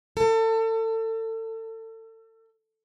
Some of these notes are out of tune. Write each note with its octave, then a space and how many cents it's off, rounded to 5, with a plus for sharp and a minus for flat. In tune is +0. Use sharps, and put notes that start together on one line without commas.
A4 +30